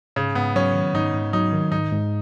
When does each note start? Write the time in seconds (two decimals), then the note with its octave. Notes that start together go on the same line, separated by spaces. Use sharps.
0.16 G#2 C#3
0.35 G#2 B3
0.55 F#3 C#4
0.74 D#3
0.94 G#2 D#4
1.14 G#2
1.33 F#3 D#4
1.53 D#3
1.72 G#2 D#4
1.92 G#2